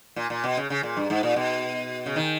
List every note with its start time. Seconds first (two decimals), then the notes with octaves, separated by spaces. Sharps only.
0.16 A#2
0.30 A#2
0.44 B2
0.57 C#3
0.70 C#3
0.83 A#2
0.97 G2
1.10 G#2
1.23 A#2
1.36 B2
2.06 C#3
2.16 D#3